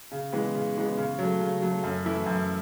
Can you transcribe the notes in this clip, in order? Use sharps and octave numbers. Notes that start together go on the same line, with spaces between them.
C#3
E3 G#3 B3
C#3
E3 G#3 B3
C#3
F#3 A3
C#3
F#3 A3
F#2
E3 A3 E4
F#2